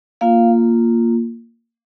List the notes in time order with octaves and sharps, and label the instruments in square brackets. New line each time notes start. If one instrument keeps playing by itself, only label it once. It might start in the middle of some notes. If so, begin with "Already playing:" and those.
[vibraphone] A#3 F4 F5